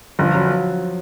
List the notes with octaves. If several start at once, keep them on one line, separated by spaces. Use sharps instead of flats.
G1 F3
F#3